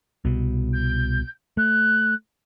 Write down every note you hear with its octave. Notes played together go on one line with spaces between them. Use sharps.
C2 B2
G6
A3 F#6